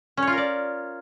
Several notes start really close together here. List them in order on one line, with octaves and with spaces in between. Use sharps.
C#4 C#5 F4 A#4 D5